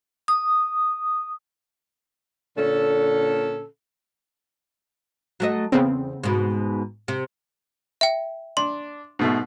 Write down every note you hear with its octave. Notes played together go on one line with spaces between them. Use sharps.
D#6
A#2 D3 C#4 A4
F#3 A3 D#5
E2 C#3 B3 C4
G#2 B2
C3
E5 G5
D4 C6
G#2 B2 A3